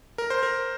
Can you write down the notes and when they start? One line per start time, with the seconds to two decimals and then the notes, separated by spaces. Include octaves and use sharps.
0.18 A#4
0.30 C5
0.43 A#4